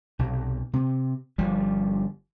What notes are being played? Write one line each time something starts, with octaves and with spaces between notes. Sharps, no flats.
B1 C3
C3 C4
G1 F3 G3